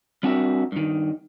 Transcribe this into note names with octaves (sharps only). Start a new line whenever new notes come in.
G3 C4 D4 F#4 A#4 E5
G2 D#3